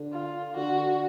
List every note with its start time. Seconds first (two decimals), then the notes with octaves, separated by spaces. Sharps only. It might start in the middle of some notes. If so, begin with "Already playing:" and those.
Already playing: D3
0.13 F4
0.56 D3 F#4